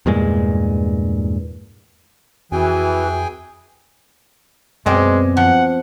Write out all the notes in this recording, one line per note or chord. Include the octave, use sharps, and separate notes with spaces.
E2 G2 A#2 G#3
F2 E3 F#4 G#4 G5 G#5
F#2 B2 G#3 C4 D5
F3 F#5